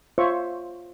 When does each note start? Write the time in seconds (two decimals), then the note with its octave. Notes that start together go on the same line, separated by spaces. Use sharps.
0.18 F4 C5 C#5 E5 C#6